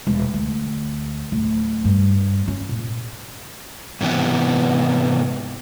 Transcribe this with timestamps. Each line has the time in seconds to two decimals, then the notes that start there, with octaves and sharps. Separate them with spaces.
0.07 E1
0.33 D2
1.32 D1
1.84 G2
2.48 C#4
2.69 A#2
4.01 G#2 C3 E3 B3